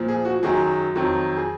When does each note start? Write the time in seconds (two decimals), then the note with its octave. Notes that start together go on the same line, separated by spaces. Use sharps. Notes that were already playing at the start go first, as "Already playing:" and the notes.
Already playing: A#2 F3
0.08 G#4
0.25 F#4
0.43 F#2 D#3 F#3 G#4
0.95 F2 D#3 F#3
1.37 G#4